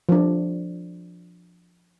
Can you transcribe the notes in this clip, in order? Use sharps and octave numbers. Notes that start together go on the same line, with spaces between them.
F3 D4